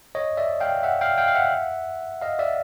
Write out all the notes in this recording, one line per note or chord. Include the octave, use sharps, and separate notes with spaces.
C#5 D#5
D5 E5
F5 G5
E5 F#5
F5 G5
F5 G5
F5
E5 F#5
D#5 F5
D5 E5